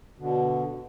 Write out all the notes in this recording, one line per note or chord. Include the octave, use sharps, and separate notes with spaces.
B2 D3